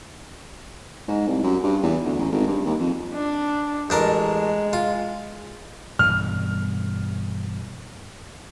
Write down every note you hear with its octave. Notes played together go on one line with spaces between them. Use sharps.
G#2
C2
F#2
G2
E2
D2
A1
G#1
G2
D#2
F2
D4
A1 G#3 D4 A#4
F4
G2 B2 E3 F6